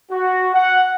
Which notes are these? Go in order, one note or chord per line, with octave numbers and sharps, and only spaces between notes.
F#4
F#5